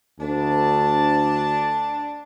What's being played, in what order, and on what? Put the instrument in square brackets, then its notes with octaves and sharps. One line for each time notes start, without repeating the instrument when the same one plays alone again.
[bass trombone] D2 [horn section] D4 A5